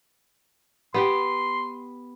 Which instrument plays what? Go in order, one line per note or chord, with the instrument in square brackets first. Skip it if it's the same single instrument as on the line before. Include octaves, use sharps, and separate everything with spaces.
[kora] B3 G4 G5 [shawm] C6